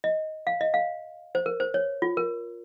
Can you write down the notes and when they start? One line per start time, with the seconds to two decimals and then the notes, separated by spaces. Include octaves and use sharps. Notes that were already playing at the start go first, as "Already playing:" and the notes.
0.04 D#5
0.47 F5
0.61 D#5
0.74 F5
1.35 C5
1.46 A#4
1.60 C5
1.74 C#5
2.02 F4
2.17 A#4